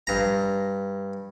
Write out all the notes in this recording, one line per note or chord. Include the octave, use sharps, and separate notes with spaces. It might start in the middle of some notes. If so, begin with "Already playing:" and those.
G2 A#5